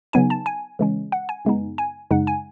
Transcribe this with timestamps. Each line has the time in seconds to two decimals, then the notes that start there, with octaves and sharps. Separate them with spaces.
0.13 C#3 F#3 B3 D#4 G#5
0.30 A5
0.46 G#5
0.79 C#3 E3 G#3 C#4
1.12 F#5
1.29 G#5
1.45 F#2 C#3 G#3 B3 D#4
1.78 G#5
2.11 F#2 C#3 G#3 D#4 F#5
2.27 G#5